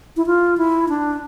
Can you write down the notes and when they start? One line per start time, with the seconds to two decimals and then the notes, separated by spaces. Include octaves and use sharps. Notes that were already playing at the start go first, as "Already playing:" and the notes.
0.17 E4
0.26 F4
0.58 E4
0.89 D4